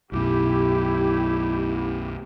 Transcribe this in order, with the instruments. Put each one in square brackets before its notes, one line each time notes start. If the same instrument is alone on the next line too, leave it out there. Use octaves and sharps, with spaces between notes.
[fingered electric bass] B1 F#2 B2 [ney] E4 [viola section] G4